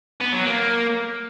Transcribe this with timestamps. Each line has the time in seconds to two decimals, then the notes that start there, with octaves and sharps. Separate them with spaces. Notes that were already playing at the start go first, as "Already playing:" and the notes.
0.20 B3
0.32 F#3
0.44 A#3